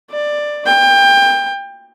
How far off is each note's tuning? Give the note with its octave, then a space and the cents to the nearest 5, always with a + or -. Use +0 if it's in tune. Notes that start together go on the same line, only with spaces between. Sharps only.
D5 +15
G5 +25